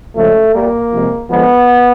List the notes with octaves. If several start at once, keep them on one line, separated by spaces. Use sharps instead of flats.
C#3 F3 G#3 A3
A#2 G3 A#3
C3 F3 G#3
D3 F3 G#3 B3